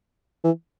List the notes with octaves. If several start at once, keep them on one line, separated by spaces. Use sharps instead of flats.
E3